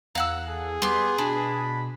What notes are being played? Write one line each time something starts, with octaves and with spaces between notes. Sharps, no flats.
E2 F5 F#5 A#5 E6
G#4 A4
G3 B3 G4 C6
B2 D4 B5